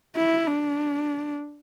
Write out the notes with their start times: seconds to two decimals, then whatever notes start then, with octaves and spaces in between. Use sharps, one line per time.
0.16 E4
0.48 D4